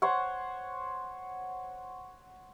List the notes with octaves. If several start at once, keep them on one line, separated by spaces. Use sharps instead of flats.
C5 C#5 F#5